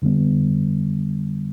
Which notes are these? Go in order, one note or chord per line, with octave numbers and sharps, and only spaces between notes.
F2 D3 G3 B3